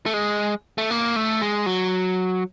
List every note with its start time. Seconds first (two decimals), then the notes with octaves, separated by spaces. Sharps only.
0.06 A3
0.14 G#3
0.78 A3
0.91 A#3
1.16 A3
1.41 G#3
1.66 F#3